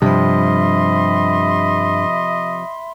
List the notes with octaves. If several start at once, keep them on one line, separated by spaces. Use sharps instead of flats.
G2 C3 F3 D#5 E5 B5 C6